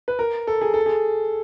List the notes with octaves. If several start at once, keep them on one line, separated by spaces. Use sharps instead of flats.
B4
A#4
A4
G#4
A4
G#4